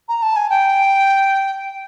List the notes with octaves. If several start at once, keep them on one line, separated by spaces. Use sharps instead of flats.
A#5
A5
G#5
G5